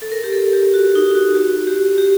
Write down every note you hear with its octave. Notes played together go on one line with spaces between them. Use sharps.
A4
A#4
G4
A4
G4
F#4
D#4
F#4
F#4
G4
G4